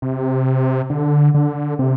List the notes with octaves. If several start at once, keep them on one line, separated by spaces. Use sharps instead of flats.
C3
D3
D3
C3